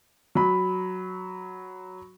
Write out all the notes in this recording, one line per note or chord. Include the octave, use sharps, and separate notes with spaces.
F#3 B5